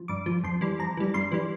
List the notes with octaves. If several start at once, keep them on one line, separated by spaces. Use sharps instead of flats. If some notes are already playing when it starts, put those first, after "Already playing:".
Already playing: F3
G2 D6
F3
F2 C6
E3 G3
F2 A#5
E3 G3
G2 C6
E3 G3